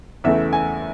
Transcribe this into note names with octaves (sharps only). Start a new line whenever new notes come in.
E2 C#3 E3 A3 E5
G#5